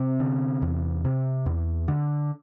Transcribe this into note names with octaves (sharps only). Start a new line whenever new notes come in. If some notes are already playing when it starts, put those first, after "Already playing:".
Already playing: C3 C4
D3
E2
C3
E2
D3